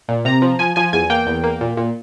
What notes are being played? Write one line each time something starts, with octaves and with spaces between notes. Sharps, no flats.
A#2
C3 A#5
F3
F3 G#5
F3 G#5
E2 G#5
A#3 G5
E2
A#3
A#2
A#2